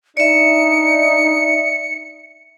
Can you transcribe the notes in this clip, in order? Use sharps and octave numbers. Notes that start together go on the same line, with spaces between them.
D4 D#4 D5 E5 C#7